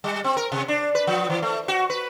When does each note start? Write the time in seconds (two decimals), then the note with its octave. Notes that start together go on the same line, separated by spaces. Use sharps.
0.04 G3
0.24 C4
0.37 A#4
0.52 C3
0.68 D4
0.95 B4
1.07 F3
1.30 E3
1.42 A3
1.68 F#4
1.90 B4